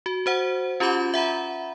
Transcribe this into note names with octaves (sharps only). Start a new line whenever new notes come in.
F#4
F#4 C5 F#5
C#4 F4 G4 B5 D6 G6
E5 F#5 A#5 B5